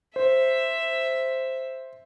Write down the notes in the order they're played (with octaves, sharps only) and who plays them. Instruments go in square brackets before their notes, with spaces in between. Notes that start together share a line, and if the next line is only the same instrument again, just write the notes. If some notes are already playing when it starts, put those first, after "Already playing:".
[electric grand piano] C5 [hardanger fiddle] E5